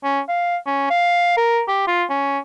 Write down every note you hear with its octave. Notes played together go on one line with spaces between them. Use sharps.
C#4
F5
C#4
F5
A#4
G4
F4
C#4